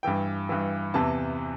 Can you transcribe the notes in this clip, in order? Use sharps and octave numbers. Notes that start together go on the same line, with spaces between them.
G2 E3 G5
G2 E3
E2 C3 E3 A5